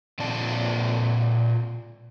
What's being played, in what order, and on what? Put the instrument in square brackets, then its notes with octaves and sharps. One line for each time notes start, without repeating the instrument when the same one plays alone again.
[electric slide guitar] A#2 C4 F4 D5 A5